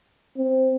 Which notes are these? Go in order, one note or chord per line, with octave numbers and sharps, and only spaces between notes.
C4